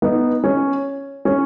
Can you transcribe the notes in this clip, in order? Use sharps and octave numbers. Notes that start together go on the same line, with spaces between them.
B3 D#4
C#4
C#4